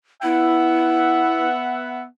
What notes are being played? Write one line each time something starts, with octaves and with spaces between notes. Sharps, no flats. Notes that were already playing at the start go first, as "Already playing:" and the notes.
B3 E4 E5 F#5